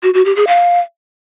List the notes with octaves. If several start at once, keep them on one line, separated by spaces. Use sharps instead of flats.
F#4
F#4
G4
G#4
F5